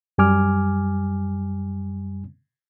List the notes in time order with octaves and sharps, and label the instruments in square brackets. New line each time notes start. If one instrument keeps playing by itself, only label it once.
[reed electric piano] F#2 G3 G#5 D6 F6